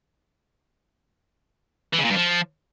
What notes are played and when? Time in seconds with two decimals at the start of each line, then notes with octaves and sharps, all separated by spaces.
1.93 E3
1.99 C#3
2.05 A#2
2.10 G2
2.16 F3